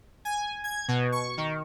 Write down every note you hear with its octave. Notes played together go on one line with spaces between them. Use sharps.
G#5
G#6
B2
C#6
D#3